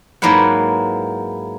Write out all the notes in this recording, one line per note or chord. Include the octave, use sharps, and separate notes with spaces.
G#2 F#3 A#3 E4 B4 F#5